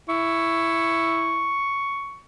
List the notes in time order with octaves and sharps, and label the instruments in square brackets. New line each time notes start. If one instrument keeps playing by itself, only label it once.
[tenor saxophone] E4 [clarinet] C#6